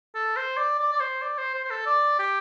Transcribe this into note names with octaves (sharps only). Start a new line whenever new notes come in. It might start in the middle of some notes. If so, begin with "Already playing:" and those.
A4
C5
D5
D5
D5
C5
D5
C5
C5
C5
A4
D5
G4